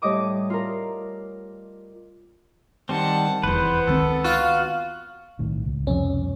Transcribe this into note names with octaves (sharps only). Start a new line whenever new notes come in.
A2 G3 C#5 D#5 D6 D#6
F4 A#4
D#3 G3 C4 F#5 A5
F1 E2 B3 B4 C5
C#2 D#3 C4 A4
F4 F#4
B1 A2 D#3
C#2
C2 F2 B2 C#4